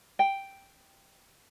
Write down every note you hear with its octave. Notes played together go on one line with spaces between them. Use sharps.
G5